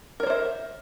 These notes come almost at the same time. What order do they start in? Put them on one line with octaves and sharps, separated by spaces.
A#4 C#5 C5 E5